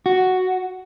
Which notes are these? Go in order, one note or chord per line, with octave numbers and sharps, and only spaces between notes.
F#4